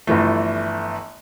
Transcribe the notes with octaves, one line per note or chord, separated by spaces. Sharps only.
G1 E3 F3 A3